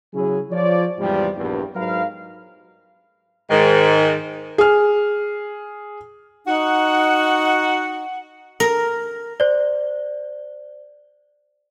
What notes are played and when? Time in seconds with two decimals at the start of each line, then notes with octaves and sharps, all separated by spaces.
0.13 C#3 F#3 C#4 E4 G#4
0.51 F3 C#5 D5
0.97 E2 G#2 C3 F3 G3
1.37 A#1 E2 G2
1.74 G#2 F#3 A#4 B4 F5
3.50 G#2 D#3
4.58 G#4 F6
6.46 D#4 F#4 F#5
8.60 A#4
9.40 C5 D5